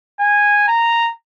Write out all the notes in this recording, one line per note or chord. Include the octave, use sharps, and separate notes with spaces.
G#5
A#5